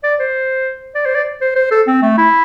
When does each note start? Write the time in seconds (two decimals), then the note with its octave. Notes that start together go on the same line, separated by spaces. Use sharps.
0.03 D5
0.19 C5
0.95 D5
1.06 C5
1.15 D5
1.41 C5
1.56 C5
1.71 A4
1.87 C4
2.02 A3
2.18 E4